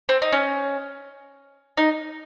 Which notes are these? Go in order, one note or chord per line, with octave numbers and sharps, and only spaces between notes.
C4
D#4
C#4
D#4